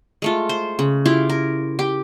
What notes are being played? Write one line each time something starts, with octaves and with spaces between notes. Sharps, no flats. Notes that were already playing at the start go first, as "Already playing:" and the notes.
G#3 A3 F4
C5
C#3
E4 F4 G4 F5
A#4
G4